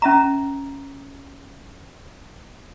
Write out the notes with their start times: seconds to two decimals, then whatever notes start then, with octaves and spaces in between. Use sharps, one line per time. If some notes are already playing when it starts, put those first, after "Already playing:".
0.02 C#4 E5 A#5